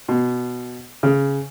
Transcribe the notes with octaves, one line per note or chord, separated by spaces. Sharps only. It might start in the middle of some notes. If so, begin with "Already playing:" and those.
B2
C#3